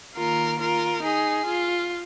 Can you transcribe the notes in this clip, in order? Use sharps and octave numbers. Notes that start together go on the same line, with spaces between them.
D#3 A#3 F4 A#4
F4 A#4
D#4 G#4
F4